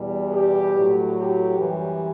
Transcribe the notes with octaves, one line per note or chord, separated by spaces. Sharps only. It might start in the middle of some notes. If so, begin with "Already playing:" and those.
Already playing: E2 B2 G3
G4
A2 F#3
G4
F#2 E3 G3